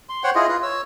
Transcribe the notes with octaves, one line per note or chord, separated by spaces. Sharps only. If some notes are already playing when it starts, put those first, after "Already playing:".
C6
C5 C#5 F#5 G5
E4 F4 G#4 D#5
F4 B4
C#5 E6